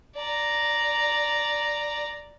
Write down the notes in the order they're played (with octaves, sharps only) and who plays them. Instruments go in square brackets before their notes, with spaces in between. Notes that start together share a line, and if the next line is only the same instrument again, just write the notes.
[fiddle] D5 A#5